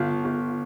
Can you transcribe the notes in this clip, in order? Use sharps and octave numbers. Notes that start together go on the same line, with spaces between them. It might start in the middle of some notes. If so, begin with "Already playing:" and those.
Already playing: G1 F4
G1